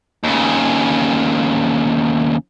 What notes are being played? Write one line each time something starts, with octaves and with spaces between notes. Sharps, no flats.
D#2 C#3